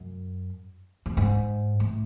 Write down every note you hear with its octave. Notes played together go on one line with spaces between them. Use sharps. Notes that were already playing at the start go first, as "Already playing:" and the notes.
Already playing: F#2
A2
G#2
A2